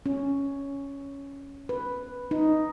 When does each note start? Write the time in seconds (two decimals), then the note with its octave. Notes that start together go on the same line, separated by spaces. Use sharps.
0.06 C#4
1.69 B4
2.31 D#4